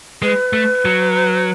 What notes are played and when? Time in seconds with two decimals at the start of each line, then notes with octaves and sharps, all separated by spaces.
0.22 G#3 B4
0.53 A3
0.85 F#3